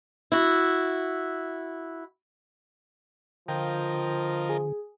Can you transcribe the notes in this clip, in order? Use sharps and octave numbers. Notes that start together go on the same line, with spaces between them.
E4 F#4
D3 F3 F4 A#4 D#5 G5 G6
G#4